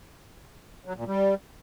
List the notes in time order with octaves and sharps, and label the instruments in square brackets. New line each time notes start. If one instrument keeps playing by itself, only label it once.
[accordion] F#3
A#2
G3